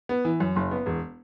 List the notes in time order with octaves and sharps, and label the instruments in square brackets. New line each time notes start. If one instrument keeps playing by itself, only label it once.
[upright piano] B3
E3
F#2
F#1
B3
E1